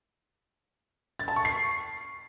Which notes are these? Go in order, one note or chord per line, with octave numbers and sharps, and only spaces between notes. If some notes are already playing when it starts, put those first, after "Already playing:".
A6
A5
C#6
C7